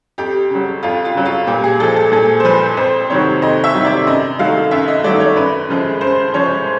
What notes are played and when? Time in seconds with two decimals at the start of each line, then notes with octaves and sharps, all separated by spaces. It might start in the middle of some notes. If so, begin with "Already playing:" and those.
0.18 F2 G4
0.50 C#3 F#3
0.83 F2 F4
1.05 F4
1.15 C#3 F#3
1.25 F4
1.47 A#2 G4
1.64 G#4
1.80 F3 G#3 A4
1.96 A4
2.12 A#2 A4
2.40 C5
2.44 F3 G#3 B4
2.77 F2 C5
3.10 C3 D#3 F#3 C#5
3.42 F2 D#5
3.64 E5
3.74 C3 D#3 F#3
3.85 D5
4.07 F#2 D#5
4.39 D#3 F#3 A3 F5
4.71 F#2 E5
4.88 D#5
5.04 D#3 F#3 A3 D5
5.20 C#5
5.36 F#2 B4
5.69 C#3 F3 G#3
6.01 F#2 C5
6.34 C#3 F3 G#3 C#5